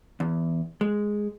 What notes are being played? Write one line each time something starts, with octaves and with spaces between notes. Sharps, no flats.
E2
G#3